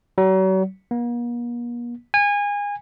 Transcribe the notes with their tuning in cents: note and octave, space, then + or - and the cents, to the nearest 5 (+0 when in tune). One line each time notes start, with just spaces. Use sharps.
F#3 +40
A#3 +45
G#5 -25